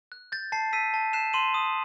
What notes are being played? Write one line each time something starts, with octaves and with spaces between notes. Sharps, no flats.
F#6
G6 A6
A5 A6 C7
E6 B6 D#7
A5
F#6 C7 E7
C6 D#7 F#7
D#6